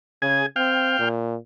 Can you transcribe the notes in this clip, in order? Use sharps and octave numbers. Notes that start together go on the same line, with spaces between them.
C#3 G#4 G#5
C4 F5 G5
A#2